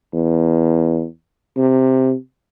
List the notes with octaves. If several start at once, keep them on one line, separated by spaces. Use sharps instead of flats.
E2
C3